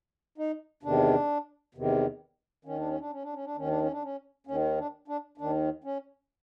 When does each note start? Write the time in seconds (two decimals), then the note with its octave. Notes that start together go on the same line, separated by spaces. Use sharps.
0.38 D#4
0.83 E2 C3 D#3 D4
1.75 E2 C3 D#3
2.65 D#2 D#3 C#4
2.77 D4
2.87 C#4
3.00 D4
3.12 C#4
3.23 D4
3.34 C#4
3.45 D4
3.56 D#2 D#3 C#4
3.69 D4
3.80 C#4
3.91 D4
4.03 C#4
4.47 D#2 D#3 C#4
4.78 D4
5.08 D4
5.38 D#2 D#3 D4
5.84 C#4